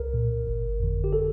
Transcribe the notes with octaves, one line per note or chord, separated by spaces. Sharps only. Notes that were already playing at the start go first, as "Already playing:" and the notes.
Already playing: C2 A#4
A#2
G1
F2 D3
G4
A4